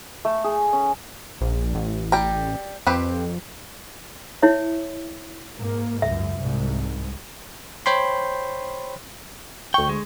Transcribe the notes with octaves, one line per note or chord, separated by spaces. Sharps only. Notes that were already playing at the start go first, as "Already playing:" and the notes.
A3
G#4
C#4
A#1
A1
G3 G5 A#5
F2 C4 G4 B4
E4 C#5 E5
G#2 A#3
C#2 F#2 E5
C2 G#2
C5 C#5 G5 B5 C6
D2 G5 C#6
G#3